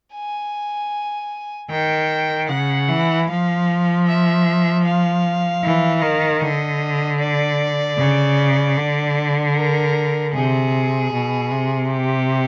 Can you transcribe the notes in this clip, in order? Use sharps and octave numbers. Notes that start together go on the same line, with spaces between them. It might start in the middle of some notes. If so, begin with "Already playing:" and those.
G#5
D#3 G5
C#3 F#5
E3
F3 F5
E5
F5
E3
D#3
D3 D#5
D5
C#3
D3
A#4
C3 G#4
B2
C3
G4